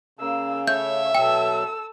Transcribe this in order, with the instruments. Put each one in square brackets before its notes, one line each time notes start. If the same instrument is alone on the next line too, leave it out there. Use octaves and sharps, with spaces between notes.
[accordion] C#3 [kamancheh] A#3 E6
[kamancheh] A3 C#5 [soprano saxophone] E5 [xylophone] G6
[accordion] B2 F#3 [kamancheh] A4 E6 [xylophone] G5